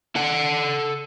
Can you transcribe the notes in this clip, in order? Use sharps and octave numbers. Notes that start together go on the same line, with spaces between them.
A4 F#5